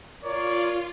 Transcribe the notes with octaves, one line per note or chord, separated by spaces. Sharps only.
F4 A#4 C#5 D5